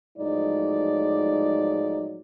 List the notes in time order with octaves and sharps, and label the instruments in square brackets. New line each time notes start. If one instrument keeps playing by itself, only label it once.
[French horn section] A2 F3 F#3 G#3 D#4 D5